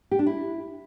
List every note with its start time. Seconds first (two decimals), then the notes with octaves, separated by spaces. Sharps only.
0.11 G4
0.19 D4
0.27 E4